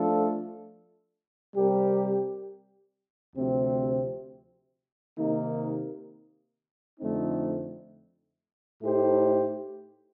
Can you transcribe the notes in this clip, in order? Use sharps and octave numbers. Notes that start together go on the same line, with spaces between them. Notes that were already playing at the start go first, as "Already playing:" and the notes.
Already playing: F3 A3 D4 F4 A4
C3 G3 C4 G4 A#4
D2 C3 F3 C4
C3 D#3 A#3 D#4
F2 D3 A3 C4 D#4
A2 A3 D#4 G4 C5